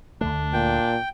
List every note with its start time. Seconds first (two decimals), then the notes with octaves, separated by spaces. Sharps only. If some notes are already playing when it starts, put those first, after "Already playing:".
0.21 D2 D3 A3 D4
0.53 A#2 G5